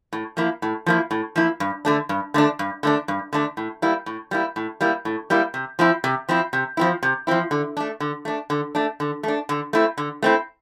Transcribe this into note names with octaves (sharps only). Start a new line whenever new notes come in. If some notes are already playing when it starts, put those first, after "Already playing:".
A2
F3 A#3 E4
A2
F3 A#3 E4
A2
F3 A#3 E4
G2
D3 A3 D4
G2
D3 A3 D4
G2
D3 A3 D4
G2
D3 A3 D4
A2
G3 A#3 E4
A2
G3 A#3 E4
A2
G3 A#3 E4
A2
G3 A#3 E4
C3
F3 C4 E4
C3
F3 C4 E4
C3
F3 C4 E4
C3
F3 C4 E4
D3
A3 D4
D3
A3 D4
D3
A3 D4
D3
A3 D4
D3
A3 C4 E4
D3
A3 C4 E4